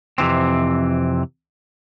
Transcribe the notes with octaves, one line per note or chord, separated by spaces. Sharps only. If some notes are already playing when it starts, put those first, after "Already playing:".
F2 C3 E3 C4